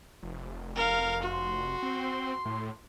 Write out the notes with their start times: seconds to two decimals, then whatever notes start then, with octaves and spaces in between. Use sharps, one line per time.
0.23 F1
0.76 A#4 F5
1.22 F#4 C6
1.83 C4
2.45 A2